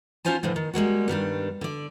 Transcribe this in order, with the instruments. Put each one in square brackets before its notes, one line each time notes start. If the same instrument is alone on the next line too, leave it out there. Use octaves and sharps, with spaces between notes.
[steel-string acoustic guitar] C#4 D#4 F4 C5 G#5 A5
A2 D3 E3 F3
D#3
G3 G#3 A#3 F#4
G2 D#3 G3 D4
D3 D5